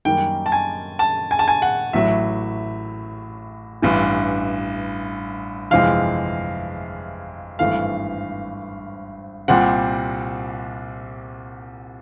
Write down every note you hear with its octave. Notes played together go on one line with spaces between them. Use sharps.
F#2 D#3 G3 A#3 G5
A5
G#5
A5
G#5
A5
G#5
F#5
A1 A2 F#3 E5
A1 G2 E3
G1 F2 C3 E3 G#3 F5
G#1 G2 E3 A3 F5
C2 A#2 G3 C4 F#5